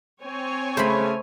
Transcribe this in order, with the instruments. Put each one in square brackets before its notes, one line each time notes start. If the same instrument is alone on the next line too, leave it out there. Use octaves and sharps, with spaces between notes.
[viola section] C4 C#5 G#5
[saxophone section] C#3 [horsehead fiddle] A3 [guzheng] C5 B5